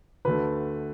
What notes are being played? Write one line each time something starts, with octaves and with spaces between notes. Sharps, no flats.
D2 D3 A3 B4